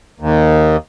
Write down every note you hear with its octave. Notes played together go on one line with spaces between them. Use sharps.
D#2